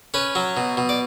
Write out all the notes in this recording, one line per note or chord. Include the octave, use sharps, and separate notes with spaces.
C#4 B4
F#3
B2
B2
D5